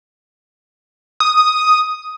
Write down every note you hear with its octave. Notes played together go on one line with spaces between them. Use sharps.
D#6